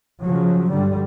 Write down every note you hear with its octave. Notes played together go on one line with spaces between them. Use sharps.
C#3 F3 F#3
G2 D3 G3